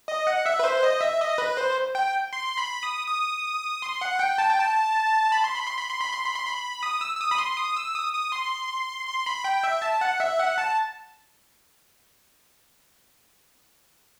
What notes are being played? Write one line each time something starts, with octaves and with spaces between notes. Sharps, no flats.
D#5
F#5
E5
B4
C5
D#5
E5
D#5
B4
C5
G5
C6
B5
D#6
D#6
C6
F#5
G5
A5
G5
A5
B5
C6
B5
C6
B5
C6
B5
C6
B5
C6
B5
D#6
E6
E6
D#6
B5
C6
D#6
E6
D#6
D#6
C6
C6
B5
G5
E5
A5
F#5
E5
F#5
A5